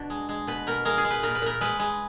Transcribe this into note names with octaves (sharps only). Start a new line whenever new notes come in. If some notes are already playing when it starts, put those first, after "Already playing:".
Already playing: B2 D4
G#3
G#3
B2 B4
B2 A#4
G#3 A#4
G#4
G#3
B4
A#2 A#4
B4
A#2 A#4
G#3 B4
G#3